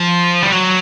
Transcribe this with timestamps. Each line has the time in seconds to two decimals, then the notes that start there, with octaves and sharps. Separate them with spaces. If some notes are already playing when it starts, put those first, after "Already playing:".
Already playing: F3
0.42 G3
0.50 F#3